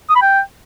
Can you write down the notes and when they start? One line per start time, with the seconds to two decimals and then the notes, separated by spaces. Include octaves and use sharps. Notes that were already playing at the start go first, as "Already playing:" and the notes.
0.10 D#6
0.16 B5
0.22 G5